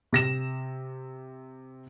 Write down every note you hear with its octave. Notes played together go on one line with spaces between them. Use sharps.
C3 A#6 E7